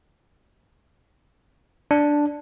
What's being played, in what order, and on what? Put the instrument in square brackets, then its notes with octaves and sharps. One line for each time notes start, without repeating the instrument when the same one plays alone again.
[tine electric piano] D4